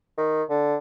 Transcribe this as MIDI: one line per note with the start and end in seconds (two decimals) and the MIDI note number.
0.18 0.43 51
0.49 0.76 50